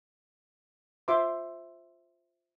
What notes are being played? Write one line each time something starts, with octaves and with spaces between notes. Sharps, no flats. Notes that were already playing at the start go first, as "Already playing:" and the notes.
F4 C5 E5 C6 D6